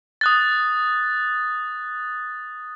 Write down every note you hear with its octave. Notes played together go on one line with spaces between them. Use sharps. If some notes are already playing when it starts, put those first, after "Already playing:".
D#6 F#6 A6